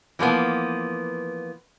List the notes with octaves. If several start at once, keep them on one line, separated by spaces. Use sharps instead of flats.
E3 F3 A#3 B3